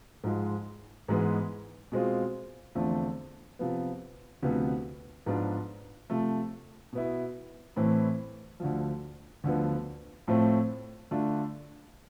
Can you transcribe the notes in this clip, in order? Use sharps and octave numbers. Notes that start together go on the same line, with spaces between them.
G#2 F3 G#3
G#2 E3 G#3 B3
B2 G#3 C4 F4
E2 D3 F3 A3 C4
C3 F3 B3
D2 C3 F3 B3
G#2 F3 B3 D4 F4
C3 F3 A3
B2 B3 E4
A2 E3 A3 C4
D2 D3 F3
D2 D3 F3 B3
A2 F3 A3 C4
D3 A3 D4 F4